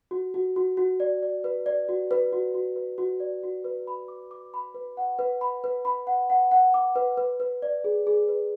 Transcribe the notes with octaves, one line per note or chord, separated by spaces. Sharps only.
F#4
F#4
F#4
F#4
D5
D5
B4
D5
F#4
B4
F#4
F#4
B4
F#4
D5
F#4
B4
B5
D6
D6
B5
B4
F#5
B4
B5
B4
B5
F#5
F#5
F#5
D6
B4
B4
B4
D5
G#4
G#4
B4